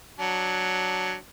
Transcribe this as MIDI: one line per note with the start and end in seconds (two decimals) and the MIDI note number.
0.19 1.14 54
0.19 1.14 62